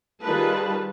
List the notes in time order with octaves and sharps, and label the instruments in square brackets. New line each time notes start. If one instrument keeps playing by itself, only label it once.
[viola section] D#3 G3 F4 G#4 B4 A5